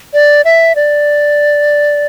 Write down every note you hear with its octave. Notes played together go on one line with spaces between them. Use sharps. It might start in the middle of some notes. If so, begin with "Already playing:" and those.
D5
E5
D5